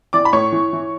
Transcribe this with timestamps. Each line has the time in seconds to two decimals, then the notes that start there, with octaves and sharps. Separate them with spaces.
0.13 E3 D5 D6
0.25 B5
0.33 A2 C#5 C#6
0.52 E3
0.73 E3